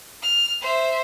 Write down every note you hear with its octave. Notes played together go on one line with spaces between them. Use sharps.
F6
C5 E5